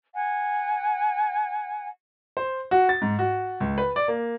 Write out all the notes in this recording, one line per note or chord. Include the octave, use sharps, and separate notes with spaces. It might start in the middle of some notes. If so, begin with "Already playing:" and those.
F#5 G#5
C5
F#4
A6
G#2
F#4
C#2
B4
D5
A#3